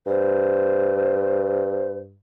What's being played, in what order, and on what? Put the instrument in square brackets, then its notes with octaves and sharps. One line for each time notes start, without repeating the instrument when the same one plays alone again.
[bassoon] G2 [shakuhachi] C5